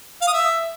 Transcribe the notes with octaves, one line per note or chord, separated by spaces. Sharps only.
F5
D#6
E5